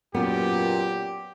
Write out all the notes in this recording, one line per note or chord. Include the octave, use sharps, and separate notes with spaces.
F#2 A#2 B3 G4